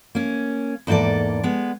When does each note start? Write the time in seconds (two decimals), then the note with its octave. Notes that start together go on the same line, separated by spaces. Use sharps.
0.15 A#3 C#4
0.87 E2 G#2 A#3 A4 D5
1.43 G#3 B3